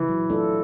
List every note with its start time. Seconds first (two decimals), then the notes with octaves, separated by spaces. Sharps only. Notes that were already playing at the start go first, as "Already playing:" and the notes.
Already playing: E3
0.09 F#3
0.30 A3 D4 F4 A4